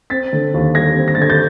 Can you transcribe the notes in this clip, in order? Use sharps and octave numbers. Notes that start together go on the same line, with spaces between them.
C4 A6 B6
D3
D#2
G3 G#6 A#6
C4
A#6
A6
D3 G#6
G6 A6